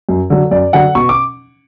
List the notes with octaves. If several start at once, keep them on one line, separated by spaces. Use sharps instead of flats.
F#2
D3 F#3
F#2 D5
D3 F#3 F#5
B2 C#6
D6